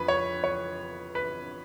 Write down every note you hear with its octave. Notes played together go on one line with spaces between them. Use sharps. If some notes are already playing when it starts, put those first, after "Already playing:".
Already playing: F2 F3 B4
C#5
C#5
B4